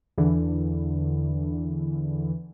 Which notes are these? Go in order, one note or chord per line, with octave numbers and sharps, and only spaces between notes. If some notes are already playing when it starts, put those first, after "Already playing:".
E2 D3 E3